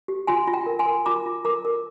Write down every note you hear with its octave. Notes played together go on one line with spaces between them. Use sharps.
G4
F4 G#5 C6
F4
G5 A#5
A#4
G#5 C6
A#4
F4 A#5 D6
F4
A#4 A#5 D6
A#4